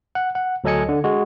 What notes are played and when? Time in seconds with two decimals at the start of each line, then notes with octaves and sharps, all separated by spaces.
0.15 F#5
0.35 F#5
0.64 D2 F#3 A4 D#5 G#5 C#7
0.89 D3
1.04 G#3 F#4